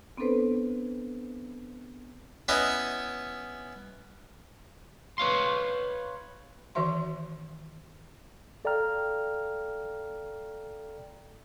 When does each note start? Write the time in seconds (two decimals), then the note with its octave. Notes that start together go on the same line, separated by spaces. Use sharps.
0.17 B3 C4 D4 A4 B4 C5
2.48 B3 C#4 E4 D#5
5.18 B4 C#5 F5 C6
6.75 D#3 E3 F#4 C5 E5 C6
8.65 A4 D5 F5 G5 A#5 F6